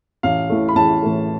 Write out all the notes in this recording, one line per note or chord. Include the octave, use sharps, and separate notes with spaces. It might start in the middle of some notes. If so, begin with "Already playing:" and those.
A1 F5
A2 E3 A3
B5
A1 A5
A2 E3 A3